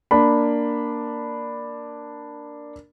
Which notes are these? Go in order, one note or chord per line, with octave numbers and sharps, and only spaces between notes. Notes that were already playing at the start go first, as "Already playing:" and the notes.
A#3 D4 B5